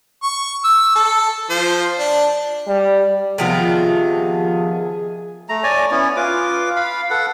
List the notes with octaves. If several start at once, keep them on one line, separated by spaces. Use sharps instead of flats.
C#6
E6
A4
F3 C5
D4
G3
C3 D#3 F3 B3 F4 G#4 A5
A3 A#5
C#5 D5 G#5
B3 C#4 E4
F4 B4 D6
F5 B5
A4 B4 F#5